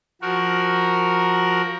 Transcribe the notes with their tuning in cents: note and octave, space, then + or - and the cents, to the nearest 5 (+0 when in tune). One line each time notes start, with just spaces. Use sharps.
F3 +0 F#4 +0 A#4 +5